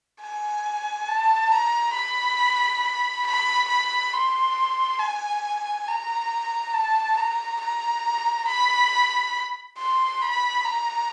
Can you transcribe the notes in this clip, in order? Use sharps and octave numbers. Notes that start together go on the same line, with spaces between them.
G#5
A5
A#5
B5
B5
B5
C6
G#5
A#5
A5
A#5
A#5
B5
C6
B5
A#5